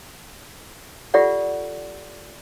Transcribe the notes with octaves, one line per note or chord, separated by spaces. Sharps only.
F4 G4 A4 D5 F#5